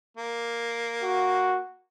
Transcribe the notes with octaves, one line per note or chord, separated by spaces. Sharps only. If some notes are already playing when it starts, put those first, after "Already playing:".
A#3
F#4